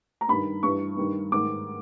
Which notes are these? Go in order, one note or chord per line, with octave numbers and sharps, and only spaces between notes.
A#5
G2 D#3 B5
G2 E3 C#6
G2 D#3
G#2 D#3 D6